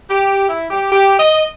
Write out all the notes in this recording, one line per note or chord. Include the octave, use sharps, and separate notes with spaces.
G4
E4
G4
G4
D#5